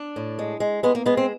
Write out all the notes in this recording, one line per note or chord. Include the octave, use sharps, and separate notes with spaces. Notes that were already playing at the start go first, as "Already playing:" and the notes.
Already playing: D4
A2
G#3
G#3
G#3 B3
A#3
G#3 B3
C4